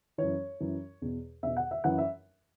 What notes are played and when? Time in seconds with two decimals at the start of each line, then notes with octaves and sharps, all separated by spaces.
0.18 F#2 E3 C#5
0.60 F#2 E3
1.02 E2 B2
1.43 E2 B2 E5
1.57 F#5
1.71 E5
1.84 F#2 E3 F#5
1.98 E5